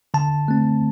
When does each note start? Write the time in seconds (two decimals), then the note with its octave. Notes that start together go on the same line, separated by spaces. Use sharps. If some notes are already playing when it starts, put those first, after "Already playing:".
0.14 D3 A5
0.48 A3 C4